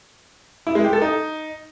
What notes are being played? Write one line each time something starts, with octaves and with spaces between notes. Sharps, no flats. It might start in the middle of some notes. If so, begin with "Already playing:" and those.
E4
G#3
G4
A4
D#4